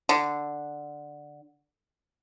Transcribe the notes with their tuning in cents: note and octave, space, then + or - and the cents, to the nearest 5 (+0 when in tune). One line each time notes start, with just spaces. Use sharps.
D3 +5